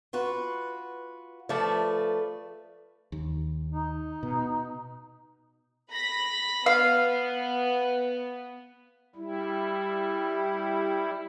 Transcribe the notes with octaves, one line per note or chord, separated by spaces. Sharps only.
F4 F#4 B4
F3 A3 B4 D5
D#2
D#4
B2
B5 A#6 B6
B3 F5
G3 E4